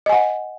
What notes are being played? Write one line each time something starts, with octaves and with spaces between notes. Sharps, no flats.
D#5 F#5 G#5